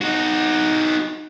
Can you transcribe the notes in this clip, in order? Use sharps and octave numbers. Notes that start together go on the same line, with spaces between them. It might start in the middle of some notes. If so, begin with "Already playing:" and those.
D#4 F#4